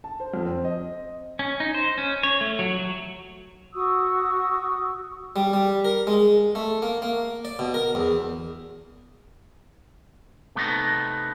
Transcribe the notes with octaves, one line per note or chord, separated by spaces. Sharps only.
A5
C5
F2
C4
D#5
C#4
D#4
C5
C#4
C#5
A3
F#3
F#3
F#4 C#6 D#6 E6
G3
G3
A#4
G#3
A3
A#3
A#3
D5
B2
A#4
E2
C3 A3 B3 D#4